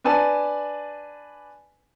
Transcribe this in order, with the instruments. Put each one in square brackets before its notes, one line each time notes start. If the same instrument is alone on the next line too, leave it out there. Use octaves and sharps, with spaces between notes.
[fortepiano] D4 B4 G#5 A5